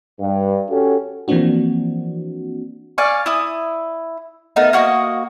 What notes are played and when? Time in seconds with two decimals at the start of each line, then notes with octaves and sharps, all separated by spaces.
0.20 G2
0.69 C#4 F#4 G4 A4
1.28 E3 F3 A#3 C4 D4 F#4
2.98 D5 F5 G#5 C#6
3.26 E4 D#6
4.56 A3 B3 D#4 A#4
4.73 A#3 F#4 B4 D#5